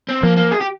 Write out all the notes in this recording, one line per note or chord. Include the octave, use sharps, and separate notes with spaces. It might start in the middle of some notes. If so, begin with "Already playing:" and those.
C4
F3 A#3
A#3
G#4
G4